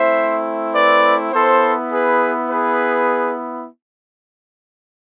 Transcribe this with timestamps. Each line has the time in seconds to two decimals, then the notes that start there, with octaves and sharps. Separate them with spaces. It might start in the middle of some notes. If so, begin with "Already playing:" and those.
Already playing: A3 C4 E4 C5 E5
0.73 B4 D5
1.32 B3 E4 A4 C5
1.92 G#4 B4
2.50 G#4 B4